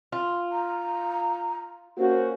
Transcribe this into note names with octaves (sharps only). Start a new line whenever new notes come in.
F4
A#5
A#3 C#4 F#4 C5